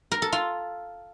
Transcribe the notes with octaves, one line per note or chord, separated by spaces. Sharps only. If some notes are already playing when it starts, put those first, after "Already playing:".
A#4
A4
F4